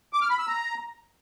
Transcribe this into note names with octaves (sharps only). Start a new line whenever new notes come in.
D6
F6
B5
E6
A#5